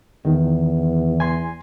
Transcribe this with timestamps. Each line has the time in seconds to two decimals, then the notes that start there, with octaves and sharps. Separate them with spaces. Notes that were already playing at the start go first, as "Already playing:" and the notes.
0.25 E2 D#3
1.20 G#5 C6